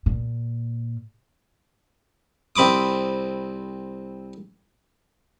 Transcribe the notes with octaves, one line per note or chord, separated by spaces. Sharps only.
A#2
C2 C4 B5 D6 D#6